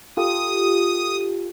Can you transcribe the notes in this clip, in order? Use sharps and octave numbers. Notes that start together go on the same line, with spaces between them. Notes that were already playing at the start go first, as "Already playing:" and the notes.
F4 G4 A4 D#6